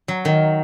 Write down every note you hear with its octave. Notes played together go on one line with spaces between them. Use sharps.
F#3
D#3